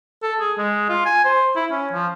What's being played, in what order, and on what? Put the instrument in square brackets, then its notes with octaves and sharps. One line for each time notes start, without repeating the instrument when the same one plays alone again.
[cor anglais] A4
G#4
G#3
F4
G#5
C5
E4
C#4
F3